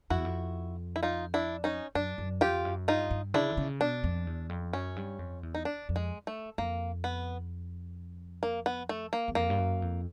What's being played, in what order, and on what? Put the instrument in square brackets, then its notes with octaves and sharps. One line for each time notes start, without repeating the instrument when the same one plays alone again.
[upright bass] F2 [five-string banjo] E4 F#4
[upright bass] E2
F2
[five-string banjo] E4
D#4 F4
D4 E4
C#4 D#4
[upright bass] F#2 [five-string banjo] D4
[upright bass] F#2
[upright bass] F2 [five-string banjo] F4 G4
[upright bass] F#2
[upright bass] G2 [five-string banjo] D#4 F4
[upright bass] G2
[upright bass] C#3 [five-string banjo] D4 E4
[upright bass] D3
C#3
[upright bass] B2 [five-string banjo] D4
[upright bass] F2
E2
F2
[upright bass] F#2 [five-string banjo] C#4
[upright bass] G2
F2
E2
[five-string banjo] D#4
D4
[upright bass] F2
[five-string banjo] G#3
A3
[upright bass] F2 [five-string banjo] A#3
[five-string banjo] B3
A#3
B3
A3
A#3
[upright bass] E2
[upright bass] F2 [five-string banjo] A#3
[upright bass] G2
F#2
F2